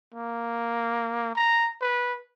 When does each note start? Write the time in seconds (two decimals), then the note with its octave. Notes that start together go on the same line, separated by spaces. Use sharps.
0.14 A#3
1.35 A#5
1.81 B4